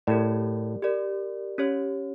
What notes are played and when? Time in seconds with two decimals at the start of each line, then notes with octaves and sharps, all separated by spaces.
0.07 A2 G4 A#4 D5
0.82 G4 A#4 D5
1.58 C#4 G4 C#5